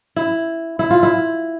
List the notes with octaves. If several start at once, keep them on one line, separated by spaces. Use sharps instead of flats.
E4
E4
F4
E4